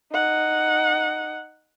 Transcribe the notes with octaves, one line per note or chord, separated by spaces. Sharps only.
D#4 F#5